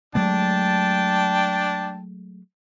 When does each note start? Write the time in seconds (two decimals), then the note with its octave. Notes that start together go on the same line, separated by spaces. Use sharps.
0.15 F#3 G#3 A3 D4 G5 A5